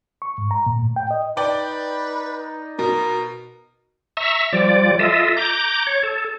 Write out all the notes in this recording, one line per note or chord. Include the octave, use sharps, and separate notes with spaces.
C#6
G#2
A#5
A#2
A2
G5
D#5
D#4 B4 D5 G5
B2 A#4
E5 A#5 C#6 E6
F3 G3 D5
F4 A4 D#5 E5
A#5 D6 G6
C#5
A4